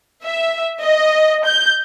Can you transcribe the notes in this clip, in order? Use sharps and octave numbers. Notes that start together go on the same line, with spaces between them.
E5
D#5
G6